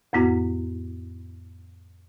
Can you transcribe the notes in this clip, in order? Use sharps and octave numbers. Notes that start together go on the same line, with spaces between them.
F2 A2 B3 E4 F#4